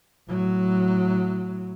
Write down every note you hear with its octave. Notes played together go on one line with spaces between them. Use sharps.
A2 F#3